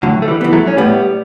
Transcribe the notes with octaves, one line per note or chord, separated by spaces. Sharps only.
A2 D3 F#3
A3
E3 G3
E3 B3
F#3 A3
C#4
A2 G3 B3